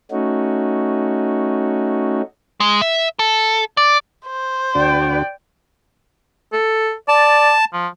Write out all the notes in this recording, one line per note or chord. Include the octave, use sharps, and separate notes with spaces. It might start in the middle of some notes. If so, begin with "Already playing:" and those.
A3 C#4 D#4 F#4
G#3
E5
A4
D5
C5
D2 D4 F#4 D5 G5
A4
D5 A5
F3